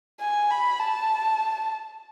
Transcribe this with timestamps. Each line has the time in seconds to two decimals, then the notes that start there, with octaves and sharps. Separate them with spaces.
0.21 G#5
0.51 B5
0.80 A5